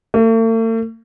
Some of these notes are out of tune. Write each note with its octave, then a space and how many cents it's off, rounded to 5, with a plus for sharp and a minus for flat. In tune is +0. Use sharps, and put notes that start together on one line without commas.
A3 +45